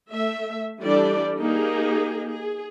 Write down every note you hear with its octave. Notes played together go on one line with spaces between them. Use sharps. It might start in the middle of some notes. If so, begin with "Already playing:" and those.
A3 E5
E3 G3 D4 G4 A4 D5
A#3 D#4 G4 G#4
G#4